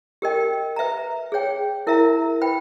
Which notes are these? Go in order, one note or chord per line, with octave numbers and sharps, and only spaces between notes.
G4 A#4 D#5 G5
B4 E5 A#5
G#4 C#5 G5
E4 A#4 E5 A#5
B4 G5 B5